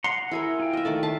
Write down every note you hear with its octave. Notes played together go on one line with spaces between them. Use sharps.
F#5 A#5 C6
E4 G#4 A#4
F4 G5
D#5 E5
D#3 A3 D5
F4 E5 A5